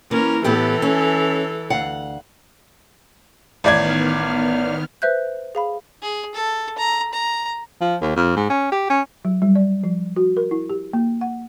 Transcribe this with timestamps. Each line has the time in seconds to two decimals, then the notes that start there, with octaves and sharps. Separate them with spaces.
0.11 E3 A#3 C#4 A#4
0.44 A2 E3 B3 G4 A4
0.82 C#4
1.70 D2 F5 F#5
3.64 A1 D#3 B3 D5 F6 G#6
5.02 B4 C5 E5 F#6 G6
5.55 G#4 F5 B5
6.02 G#4
6.35 A4
6.78 A#5
7.13 A#5
7.81 F3
8.02 D#2
8.16 F2
8.36 G#2
8.50 C#4
8.72 G4
8.90 C#4
9.25 F#3
9.42 G3
9.55 D5
9.84 F3
10.16 F#4
10.37 A#4
10.51 E4
10.70 G4
10.93 A#3
11.21 F#5